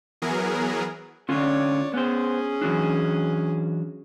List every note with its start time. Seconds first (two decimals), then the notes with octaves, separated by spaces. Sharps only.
0.22 E3 F#3 B3 G#4 A#4
1.29 D3 C#4 F4 C#5 D5
1.94 B3 C#4 G#4 C5
2.62 E3 F#3 D4